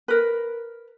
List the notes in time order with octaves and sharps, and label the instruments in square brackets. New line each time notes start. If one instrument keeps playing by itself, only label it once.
[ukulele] A#4 B4